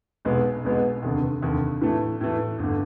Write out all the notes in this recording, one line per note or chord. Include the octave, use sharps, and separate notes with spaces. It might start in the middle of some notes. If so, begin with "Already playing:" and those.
B1 B2 G#3 B3
B1 B2 G#3 B3
F1 D#2 D3
F1 D#2 D3
A2 E3 A3
A2 E3 A3
G1 D3